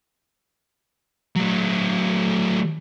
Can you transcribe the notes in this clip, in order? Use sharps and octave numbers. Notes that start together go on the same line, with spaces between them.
F#3 A3